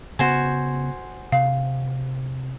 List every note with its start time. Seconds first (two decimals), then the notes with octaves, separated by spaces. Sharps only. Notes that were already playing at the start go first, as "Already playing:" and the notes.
0.19 C#3 B3 F#4 C5 G#5
1.32 C3 F5